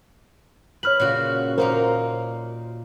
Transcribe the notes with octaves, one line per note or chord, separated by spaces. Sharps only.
B4 C#5 F6 F#7
A#2 C#3 F#4
A#2 A#3 D#4 A#4 C5